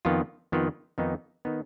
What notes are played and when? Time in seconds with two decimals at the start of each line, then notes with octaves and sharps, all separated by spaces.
0.05 F2 D#3 B3 F4
0.52 F2 D#3 B3 F4
0.98 F2 D#3 B3 D#4
1.45 D#3 B3 D#4